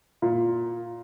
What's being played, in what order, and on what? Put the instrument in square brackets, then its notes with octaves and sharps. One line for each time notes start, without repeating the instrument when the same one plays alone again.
[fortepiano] A#2